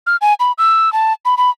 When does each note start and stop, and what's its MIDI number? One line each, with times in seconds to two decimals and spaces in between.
0.07 0.16 89
0.21 0.34 80
0.40 0.52 83
0.58 0.92 88
0.93 1.13 81
1.25 1.35 83
1.38 1.50 83